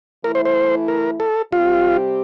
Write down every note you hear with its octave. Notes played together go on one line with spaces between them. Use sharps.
E3 A3 E4 A#4
C5
C5
A#4
A4
C3 G3 C4 F4 G4